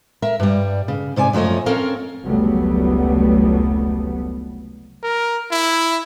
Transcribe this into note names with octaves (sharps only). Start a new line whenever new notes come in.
A#4 E5
G2 G3
C#3
G#2 C3 D5 G#5
F#2 F3 A3 C#5 D#5
C4 C#4 A4 A#4 F5
F1 C#2 F#3 G3 A3 B3
A#4
E4